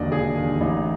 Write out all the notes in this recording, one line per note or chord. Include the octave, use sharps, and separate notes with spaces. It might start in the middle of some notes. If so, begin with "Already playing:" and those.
Already playing: E1 D#2 D3 D5 D#5
E1 G#4
D#2 D3
A1 D#4